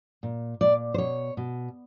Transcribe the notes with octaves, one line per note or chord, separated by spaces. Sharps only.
A#2
A#2 D5
C5
B2 C#5
B2